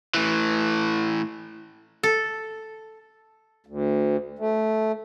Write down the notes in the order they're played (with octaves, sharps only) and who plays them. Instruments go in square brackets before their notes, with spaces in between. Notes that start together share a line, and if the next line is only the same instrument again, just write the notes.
[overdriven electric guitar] A2 E3
[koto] A4
[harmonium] D2
A3